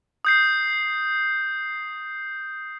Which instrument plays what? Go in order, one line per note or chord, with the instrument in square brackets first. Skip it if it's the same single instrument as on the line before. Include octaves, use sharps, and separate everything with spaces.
[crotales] D#6 G6 C7